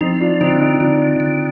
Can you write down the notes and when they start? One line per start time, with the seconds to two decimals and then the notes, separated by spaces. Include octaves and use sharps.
0.01 F3 C4 D#4
0.20 D4 F4
0.41 D3 C4 D#4
0.60 C4 D#4
0.80 D3 D4 F4
1.20 D3